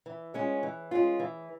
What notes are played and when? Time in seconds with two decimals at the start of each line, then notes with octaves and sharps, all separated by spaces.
0.06 E3
0.34 G#3 C#4 F4
0.63 E3
0.91 G#3 C#4 F4
1.20 E3